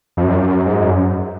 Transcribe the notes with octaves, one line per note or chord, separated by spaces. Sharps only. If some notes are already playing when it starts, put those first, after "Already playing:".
F2
F#2
G#2
F#2